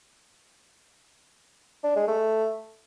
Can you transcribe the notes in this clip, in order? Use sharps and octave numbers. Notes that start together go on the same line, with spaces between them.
D4
G#3
A3